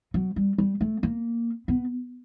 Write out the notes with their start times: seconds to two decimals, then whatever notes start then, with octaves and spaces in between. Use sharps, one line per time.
0.14 F#3
0.36 G3
0.58 G3
0.81 A3
1.03 A#3
1.68 B3